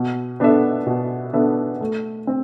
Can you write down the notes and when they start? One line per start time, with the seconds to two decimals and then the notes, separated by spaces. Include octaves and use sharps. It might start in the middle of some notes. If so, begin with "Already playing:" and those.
Already playing: B2
0.40 B3 D4 A4 E5
0.87 B2
1.33 B3 D4 A4 E5
1.81 A3
2.27 C4